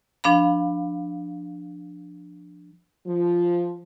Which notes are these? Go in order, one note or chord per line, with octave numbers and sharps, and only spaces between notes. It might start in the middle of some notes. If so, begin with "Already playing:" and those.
F3 D4 F5 B5
F3